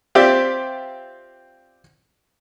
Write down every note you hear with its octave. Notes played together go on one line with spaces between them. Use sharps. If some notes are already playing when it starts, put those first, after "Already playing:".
C4 F4 G4 D5 E5